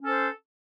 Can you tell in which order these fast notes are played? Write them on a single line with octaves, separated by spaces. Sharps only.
C#4 A4 C5